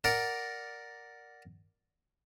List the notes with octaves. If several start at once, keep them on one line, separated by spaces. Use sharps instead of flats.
A#4 D5 F#5